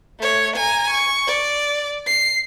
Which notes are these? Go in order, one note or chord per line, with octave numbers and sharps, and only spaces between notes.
A3 C#5
G#5 A#5
C#6
D5
C7